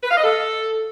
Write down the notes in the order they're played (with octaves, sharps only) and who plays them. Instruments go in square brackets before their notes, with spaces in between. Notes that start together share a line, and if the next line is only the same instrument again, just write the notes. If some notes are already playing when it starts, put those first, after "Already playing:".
[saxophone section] B4
F5
D#5
A4